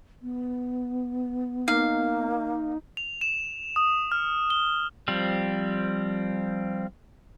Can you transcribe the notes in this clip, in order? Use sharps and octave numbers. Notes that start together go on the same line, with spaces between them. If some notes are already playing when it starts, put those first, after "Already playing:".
B3
A#3 D#4 F5
F7
E7
D#6
F6
G7
F3 G3 C4